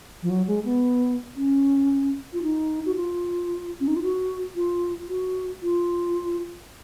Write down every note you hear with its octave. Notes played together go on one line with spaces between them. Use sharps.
F3
F#3
G#3
B3
C#4
F4
D#4
F#4
F4
C#4
D#4
F4
F#4
F4
F#4
F4